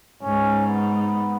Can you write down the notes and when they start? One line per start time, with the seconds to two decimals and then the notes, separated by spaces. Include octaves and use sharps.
0.23 G#2 C#4
0.67 B3